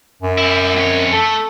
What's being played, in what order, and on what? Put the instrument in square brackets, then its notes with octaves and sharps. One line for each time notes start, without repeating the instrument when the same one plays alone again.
[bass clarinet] F#2
[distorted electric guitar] G3 E4
F2 C#5
[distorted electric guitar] A3 [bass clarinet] A4